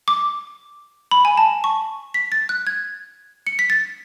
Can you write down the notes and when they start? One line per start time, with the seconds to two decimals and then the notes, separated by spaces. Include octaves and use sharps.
0.08 D6
1.11 B5
1.25 G#5
1.37 A5
1.64 C#6
2.14 B6
2.32 A6
2.49 F#6
2.67 G#6
3.47 C#7
3.59 B6
3.70 A6